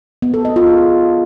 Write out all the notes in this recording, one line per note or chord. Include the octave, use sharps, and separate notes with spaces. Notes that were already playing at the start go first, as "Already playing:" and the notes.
B3
A4
D#5
F4
G#4